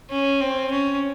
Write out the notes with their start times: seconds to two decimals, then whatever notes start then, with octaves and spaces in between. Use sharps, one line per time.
0.10 C#4
0.41 C4
0.71 C#4